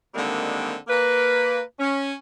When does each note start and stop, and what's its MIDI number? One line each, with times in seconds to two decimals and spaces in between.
0.14 0.74 50
0.14 0.74 51
0.14 0.74 55
0.14 0.74 56
0.14 0.74 58
0.14 0.74 60
0.88 1.60 58
0.88 1.60 71
1.79 2.12 61